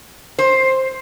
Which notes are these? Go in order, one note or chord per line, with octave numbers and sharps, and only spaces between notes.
C5